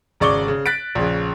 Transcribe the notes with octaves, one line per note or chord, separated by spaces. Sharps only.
G#1 C#3 D5 C#6 D6 G7
C#3
F#6 A6 B6 D7
A#1 C#3